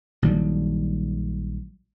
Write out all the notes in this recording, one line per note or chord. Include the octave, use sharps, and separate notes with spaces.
A#1 D#3 F#3 G3